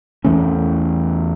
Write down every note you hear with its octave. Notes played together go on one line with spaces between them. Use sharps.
E2 E3 A3 C#4